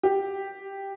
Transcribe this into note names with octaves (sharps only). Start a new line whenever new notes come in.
G4